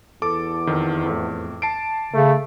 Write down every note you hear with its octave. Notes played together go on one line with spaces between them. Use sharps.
E2 A4 D6
F2 D#3
F2 A2
A5 C7 D7
C#3 A3